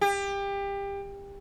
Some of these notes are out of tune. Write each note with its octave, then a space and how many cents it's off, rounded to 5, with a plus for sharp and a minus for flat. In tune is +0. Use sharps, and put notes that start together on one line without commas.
G4 +25